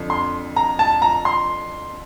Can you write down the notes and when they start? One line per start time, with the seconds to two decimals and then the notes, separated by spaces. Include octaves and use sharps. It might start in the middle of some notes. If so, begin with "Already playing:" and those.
Already playing: F2 D3 F3
0.10 C6
0.56 A#5
0.79 A5
1.02 A#5
1.25 C6